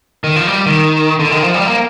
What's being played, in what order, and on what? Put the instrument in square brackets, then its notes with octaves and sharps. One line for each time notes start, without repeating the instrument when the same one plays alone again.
[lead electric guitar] D#3
F3
G3
D#3
D3
D#3
F3
G3
A#3